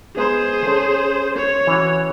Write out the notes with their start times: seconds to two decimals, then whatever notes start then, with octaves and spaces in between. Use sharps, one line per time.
0.16 G#3 B3 G#4 C5 A#5
0.64 C#4 A4
1.36 C#5
1.67 E3 C#4 F#4